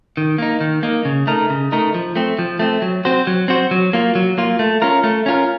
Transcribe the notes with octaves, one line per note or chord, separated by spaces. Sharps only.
D#3
A#3 D#4
D#3
A#3 D#4
C#3
A3 D#4 A#4
C#3
A3 D#4 A#4
F3
A3 C4
F3
A3 C4
F#3
C4 F#4 C5
F#3
C4 F#4 C5
F#3
A#3 F4
F#3
A#3 F4
A3
C#4 F4 A#4
A3
C#4 F4 A#4